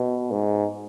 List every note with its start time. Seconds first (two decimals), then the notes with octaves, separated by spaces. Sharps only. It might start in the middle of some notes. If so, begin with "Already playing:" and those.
Already playing: B2
0.31 G#2